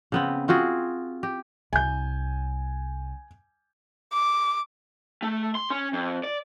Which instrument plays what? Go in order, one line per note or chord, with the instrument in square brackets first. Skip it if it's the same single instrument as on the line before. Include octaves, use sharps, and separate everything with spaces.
[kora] C#3 B3 C4
C4 F4 F#4 G#4
G4
[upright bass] C2 [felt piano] G#5 G6
[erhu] D6
[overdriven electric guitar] A3
C6
C#4
F2
D5